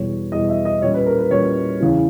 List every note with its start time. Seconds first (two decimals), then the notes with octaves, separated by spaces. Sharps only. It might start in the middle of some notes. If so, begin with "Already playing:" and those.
Already playing: E2 B2 G3 C#5
0.32 E2 B2 G3 D#5
0.49 E5
0.65 D#5
0.81 A#2 G3 C#4 C#5
0.94 B4
1.06 A#4
1.19 B4
1.31 A#2 G3 C#4 C#5
1.81 E2 C#3 E3